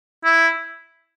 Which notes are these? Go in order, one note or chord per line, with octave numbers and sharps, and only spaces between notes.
E4